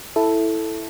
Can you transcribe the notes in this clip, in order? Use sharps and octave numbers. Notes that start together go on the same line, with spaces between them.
E4 A4